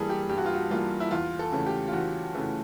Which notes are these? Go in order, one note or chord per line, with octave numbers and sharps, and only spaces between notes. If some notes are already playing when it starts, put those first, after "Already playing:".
Already playing: G2 E3 G3 A#3 G#4 A4
G4
G2 G4
F#4
F4
F#4
E3 G3 A#3 F4
E4
E2 F4
A4
C#3 E3 A3
G4
F4
E2 F#4
C#3 E3 A3